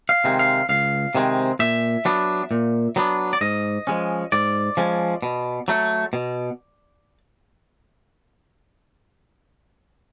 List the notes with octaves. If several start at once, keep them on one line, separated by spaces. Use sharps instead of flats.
F5
C3 D#3 G#3 C4
F5
C#2 F5
C3 D#3 G#3 C4
A#2 E5
F#3 B3 D4
A#2
F#3 B3 D4
D5
G#2 D#5
F3 G#3 C#4
G#2 D5
F3 G#3 C#4
B2
F#3 A3
B2